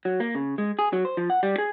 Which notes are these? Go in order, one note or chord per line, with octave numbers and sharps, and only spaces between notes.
F#3
A#3
C#3
G#3
G#4
F#3
C5
F3
F#5
G3
G#4